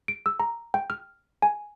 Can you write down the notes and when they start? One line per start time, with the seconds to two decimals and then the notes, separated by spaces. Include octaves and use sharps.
0.08 D7
0.26 E6
0.40 A#5
0.74 G5
0.90 F6
1.42 G#5